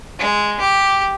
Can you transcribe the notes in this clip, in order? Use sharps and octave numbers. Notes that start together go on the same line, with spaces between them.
G#3
G4